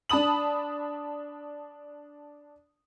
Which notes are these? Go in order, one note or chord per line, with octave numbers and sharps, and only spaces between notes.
D4 A5 B5 D#6 F#7